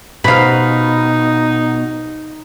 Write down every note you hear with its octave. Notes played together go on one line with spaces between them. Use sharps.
B2 D#4 F5 B5